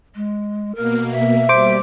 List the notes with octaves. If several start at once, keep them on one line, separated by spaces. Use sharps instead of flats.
G#3
B2 A#3 A#4
E5
G3 C5 D6